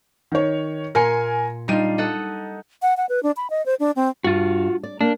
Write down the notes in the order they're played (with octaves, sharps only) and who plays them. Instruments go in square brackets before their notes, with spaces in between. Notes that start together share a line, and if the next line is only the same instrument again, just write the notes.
[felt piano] D#3 C#5
[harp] A#2 C6 C#7 [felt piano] A#4 G#5
[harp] G3 D4 F4 [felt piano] D#4 D#7
[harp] A4 D#5 F#5
[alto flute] F#5
F#5
B4
D4
B5
D#5
C5
D4
C4
[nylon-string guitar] G2 [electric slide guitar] F4 F#4
[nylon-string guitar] D5
[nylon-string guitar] A#3 [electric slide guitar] D4